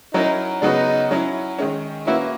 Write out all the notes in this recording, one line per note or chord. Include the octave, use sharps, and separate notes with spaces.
F#3 C#4 D#4 E4 A#4
C#3 F#3 B3 D#4 F#4
F#3 C#4 E4
D#3 G#3 C#4
A#3 C#4 E4 F#4 B4